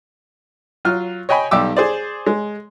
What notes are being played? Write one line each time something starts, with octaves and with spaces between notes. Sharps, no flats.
F#3 F4 F6
C#5 D#5 G5 G#5 B5
B1 G3 G4 D6 E6
G#4 C5 D5
G#3